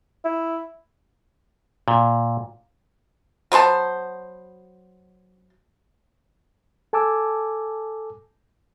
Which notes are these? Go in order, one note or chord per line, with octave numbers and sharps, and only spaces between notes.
E4
A#2
F#3 B3 C5 A5
A4 G#5 A5 D6 E6